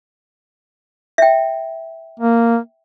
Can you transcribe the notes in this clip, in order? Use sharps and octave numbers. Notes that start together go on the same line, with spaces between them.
E5 G5
A#3